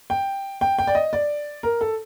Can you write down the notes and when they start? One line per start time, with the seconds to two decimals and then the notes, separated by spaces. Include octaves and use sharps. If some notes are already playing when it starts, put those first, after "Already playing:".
0.10 G5
0.61 G5
0.79 G5
0.87 D5
0.95 D#5
1.13 D5
1.63 A#4
1.81 A4